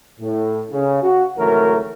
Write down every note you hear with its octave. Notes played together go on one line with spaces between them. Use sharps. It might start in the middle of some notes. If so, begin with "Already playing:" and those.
A2
C#3
F#4
G#1 C#3 E3 F#3 A3 A#4